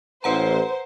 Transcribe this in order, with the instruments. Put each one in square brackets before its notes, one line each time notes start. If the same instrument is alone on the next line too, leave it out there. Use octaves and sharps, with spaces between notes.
[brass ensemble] A1 [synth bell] B4 F#5 A#5 [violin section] C5